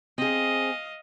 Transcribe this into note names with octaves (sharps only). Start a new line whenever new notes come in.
C4 G#4 D#5 F5